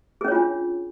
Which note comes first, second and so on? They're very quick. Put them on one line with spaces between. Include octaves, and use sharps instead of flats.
G#4 C#4 C#5 F4 D4